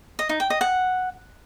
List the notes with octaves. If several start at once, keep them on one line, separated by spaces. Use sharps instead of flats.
D#5
D#4
G5
D#5
F#5